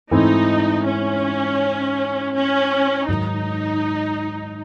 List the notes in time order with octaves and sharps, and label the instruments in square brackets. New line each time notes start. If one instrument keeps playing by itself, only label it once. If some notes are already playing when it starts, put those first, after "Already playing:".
[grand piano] G#2 E3 A3 C4 E4 [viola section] D#4
[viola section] C#4
C#4
[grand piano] G#2 D#3 F#3 [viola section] D#4